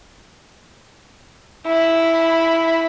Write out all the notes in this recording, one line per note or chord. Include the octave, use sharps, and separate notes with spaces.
E4 B5